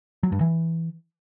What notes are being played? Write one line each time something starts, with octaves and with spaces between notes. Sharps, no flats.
F#3
G2
E3